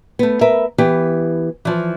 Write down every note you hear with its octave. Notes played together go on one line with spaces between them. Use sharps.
A3 B3
A#4 B4 E5
E3 B3 G4
E3 F3